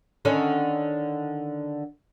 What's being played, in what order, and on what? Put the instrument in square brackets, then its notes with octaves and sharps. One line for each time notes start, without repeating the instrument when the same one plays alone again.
[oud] D3 D#3 C#4